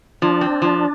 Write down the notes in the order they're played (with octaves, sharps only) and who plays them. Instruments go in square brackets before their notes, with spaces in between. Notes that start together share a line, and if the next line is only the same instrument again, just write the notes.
[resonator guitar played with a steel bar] F3 [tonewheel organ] D4
[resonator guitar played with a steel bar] C4
F3